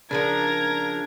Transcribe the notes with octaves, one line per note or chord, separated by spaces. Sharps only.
C#3 E3 F3 D4 A#4 A#5 G#6